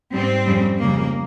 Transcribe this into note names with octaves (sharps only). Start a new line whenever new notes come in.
G#2 G3 C4
F2 C#3 G3
F2 C#3 G3 A#3